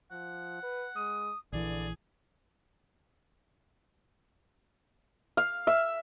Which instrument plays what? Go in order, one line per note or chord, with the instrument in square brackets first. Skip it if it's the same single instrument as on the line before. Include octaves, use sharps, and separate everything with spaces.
[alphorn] F3 [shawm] F#5
[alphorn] B4
[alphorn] G#3 [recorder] D#6
[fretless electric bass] A#1 E3 [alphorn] D3 [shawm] G#4 [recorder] D5
[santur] F5
E5